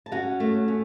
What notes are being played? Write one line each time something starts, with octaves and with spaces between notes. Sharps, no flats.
A5
C#4 F#4 F#5
A3
C#4